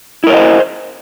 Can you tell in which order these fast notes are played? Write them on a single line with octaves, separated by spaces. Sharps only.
E4 A#4 C#5 D#5 C5